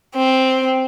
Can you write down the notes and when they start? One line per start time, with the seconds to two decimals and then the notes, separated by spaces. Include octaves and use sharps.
0.15 C4